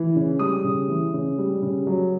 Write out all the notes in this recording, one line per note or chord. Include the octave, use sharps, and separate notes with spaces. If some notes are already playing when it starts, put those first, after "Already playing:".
Already playing: E3
C#3
G3 D#6
C#3
E3
C#3
G3
C#3
F#3